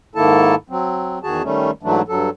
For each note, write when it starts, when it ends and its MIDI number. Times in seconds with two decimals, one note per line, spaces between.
0.15 0.55 44
0.15 0.55 51
0.15 0.55 58
0.15 0.55 64
0.15 0.55 69
0.15 0.55 81
0.70 1.19 54
0.70 1.19 60
1.23 1.42 40
1.23 1.42 51
1.23 1.42 66
1.23 1.42 68
1.23 1.42 81
1.43 1.71 51
1.43 1.71 55
1.43 1.71 57
1.43 1.71 61
1.83 2.02 44
1.83 2.02 52
1.83 2.02 54
1.83 2.02 57
1.83 2.02 62
2.08 2.30 43
2.08 2.30 54
2.08 2.30 69